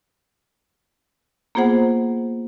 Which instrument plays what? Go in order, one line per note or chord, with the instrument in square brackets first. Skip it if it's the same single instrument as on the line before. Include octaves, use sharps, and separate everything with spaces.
[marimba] A#3 B3 F4 G#4 C5 F#5